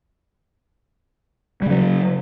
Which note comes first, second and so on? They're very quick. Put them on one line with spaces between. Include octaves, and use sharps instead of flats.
G3 C#3 F#3